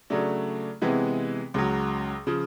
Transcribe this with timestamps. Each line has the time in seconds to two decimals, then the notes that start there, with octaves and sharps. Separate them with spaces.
0.10 C#3 F#3 A3 D4
0.82 C3 E3 G#3 B3
1.54 C#2 C#3 F#3
2.27 C#3 F3